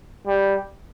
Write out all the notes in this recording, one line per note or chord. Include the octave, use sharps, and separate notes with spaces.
G3